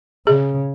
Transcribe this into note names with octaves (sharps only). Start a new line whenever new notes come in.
C#3 G#4